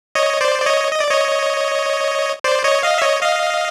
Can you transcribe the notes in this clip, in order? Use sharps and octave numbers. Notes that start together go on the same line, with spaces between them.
C#5 D#5
C5 D5
D5
C#5 D#5
D#5
D5
C#5 D#5
C5 D5
C#5 D#5
D#5 F5
E5
C#5 D#5
D#5 F5